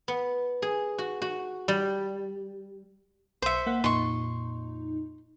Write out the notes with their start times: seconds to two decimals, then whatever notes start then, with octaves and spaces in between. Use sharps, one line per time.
0.08 B3
0.62 G#4
0.98 F#4
1.22 F#4
1.68 G3
3.42 B1 C5 E5 C#7
3.67 A#3 F#5 B6
3.84 F2 A#2 D#4 C6 C#6